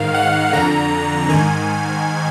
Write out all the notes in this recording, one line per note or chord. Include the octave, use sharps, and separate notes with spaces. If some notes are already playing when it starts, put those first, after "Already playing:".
Already playing: G#2 D#3 F5
F#5
F2 D3 A#5
G#2 D#3 G#5